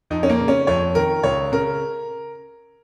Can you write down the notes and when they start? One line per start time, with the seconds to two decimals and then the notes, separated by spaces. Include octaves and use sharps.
0.10 F2 D#4
0.23 C#4
0.30 A#3
0.40 C#3
0.48 C#4
0.67 F2 C#5
0.95 D#3 A#4
1.23 C#2 C#5
1.52 C#3 A#4